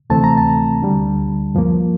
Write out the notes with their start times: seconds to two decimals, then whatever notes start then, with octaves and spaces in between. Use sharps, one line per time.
0.10 D2 C3 E3 A3 C4 A5
0.24 A#5
0.37 A5
0.82 D2 D3 G3
1.55 G2 F3 A#3